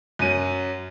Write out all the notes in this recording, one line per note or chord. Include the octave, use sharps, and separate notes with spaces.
F#2 F#3 D#7